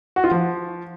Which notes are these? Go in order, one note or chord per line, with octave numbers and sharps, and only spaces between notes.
F#4
F4
F3